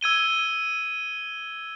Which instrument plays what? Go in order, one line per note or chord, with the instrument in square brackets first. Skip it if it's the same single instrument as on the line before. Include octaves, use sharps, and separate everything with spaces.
[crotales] E6 G#6 D#7 G7